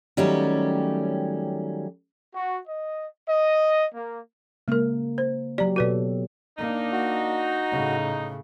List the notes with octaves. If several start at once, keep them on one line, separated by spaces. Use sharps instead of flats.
D#3 F#3 G3 A3 C#4 G4
F#4
D#5
D#5
A#3
C#3 G#3 A#3 A#4
C5
F#3 G4 D5 A#5
B2 F#4 A4 B4 D5
A#3 D4 D#4
F#4
A2 C#3